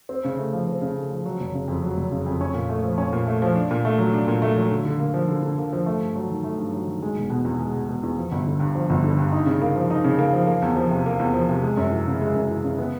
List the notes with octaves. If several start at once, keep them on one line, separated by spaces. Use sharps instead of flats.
C4
C#3
A3
F3
C4
C#3
A3
F3
F#3
F#1
C#3
F2
F#3
F#1
C#3
F2
C#4
A#2
A3
F3
C#4
A#2
A3
F3
D4
A#2
A3
F#3
D4
A#2
A3
F#3
D3
D3
A#3
F3
D3
D3
A#3
F3
A3
G2
F#3
D#3
A3
G2
F#3
D#3
G#3
E1
B2
E2
G#3
E1
B2
E2
F3
G1
D3
G2
F3
G1
D3
G2
D#4
C#3
A#3
F3
D#4
C#3
A#3
F3
A#3
E2
F3
C3
A#3
E2
F3
C3
G#3
F#2
E3
C#3
G#3
F#2
E3
C#3
B3